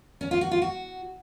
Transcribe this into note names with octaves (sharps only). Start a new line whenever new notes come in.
C#4
F4
F#4
F4
F#4